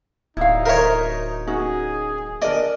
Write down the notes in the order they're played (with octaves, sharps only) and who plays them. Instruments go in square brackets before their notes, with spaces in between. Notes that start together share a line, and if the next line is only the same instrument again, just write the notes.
[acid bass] D1 [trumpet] D#4 [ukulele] E4 F5
[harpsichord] A#4 C#5 [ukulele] C5 E5
[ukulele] C#4 D#4 F#4 [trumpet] G#4
[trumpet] D4 [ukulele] A#4 D#5 [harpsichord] D5